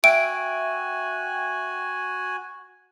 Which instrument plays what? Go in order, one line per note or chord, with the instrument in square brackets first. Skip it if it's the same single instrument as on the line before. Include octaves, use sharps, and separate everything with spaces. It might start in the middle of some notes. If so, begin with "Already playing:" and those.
[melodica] F#4 G#5 [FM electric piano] E5 G5 [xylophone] D7